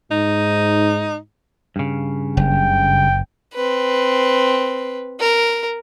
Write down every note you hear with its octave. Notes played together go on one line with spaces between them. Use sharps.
G#2 D#4
G2 C#3
F#1 G5
C4 B4
A#4